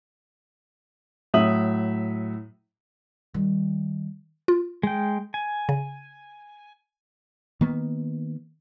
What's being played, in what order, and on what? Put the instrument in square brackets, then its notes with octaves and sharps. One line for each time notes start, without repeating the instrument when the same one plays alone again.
[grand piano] A2 F#3 E5 D#6 F#7
[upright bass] D#3 G3
[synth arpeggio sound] F4
[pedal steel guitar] G#3 G5
G#5
[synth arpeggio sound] C#3
[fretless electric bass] D#3 A#3 B3